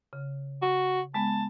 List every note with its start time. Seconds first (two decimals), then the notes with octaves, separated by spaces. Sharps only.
0.13 C#3
0.62 F#4
1.14 G#3 B3 A5